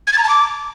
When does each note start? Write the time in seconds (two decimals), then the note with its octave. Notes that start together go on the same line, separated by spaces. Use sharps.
0.07 G#6
0.12 A6
0.18 A#5
0.23 A5
0.29 D6